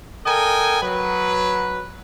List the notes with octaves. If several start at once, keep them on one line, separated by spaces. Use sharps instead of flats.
A4 A#4 D#5 G5 G#5
F#3 B4